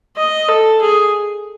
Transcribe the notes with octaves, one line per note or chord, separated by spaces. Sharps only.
D#5
A4
G#4